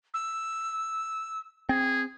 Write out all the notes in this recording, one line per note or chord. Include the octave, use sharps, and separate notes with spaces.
E6
C4 G#4